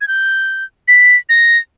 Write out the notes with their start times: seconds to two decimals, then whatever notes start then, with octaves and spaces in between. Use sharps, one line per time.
0.01 G#6
0.08 G6
0.88 B6
1.29 A#6